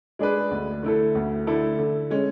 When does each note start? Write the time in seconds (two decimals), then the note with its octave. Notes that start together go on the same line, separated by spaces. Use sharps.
0.19 G#3 D4 G#4 B4
0.51 D2
0.83 D3 A3 E4 A4
1.15 D2
1.47 D3 A3 E4 A4
1.79 D3
2.10 G#3 C#4